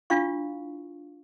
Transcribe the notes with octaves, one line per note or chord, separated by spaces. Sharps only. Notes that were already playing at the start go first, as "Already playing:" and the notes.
D4 E4 F4 F5 C#6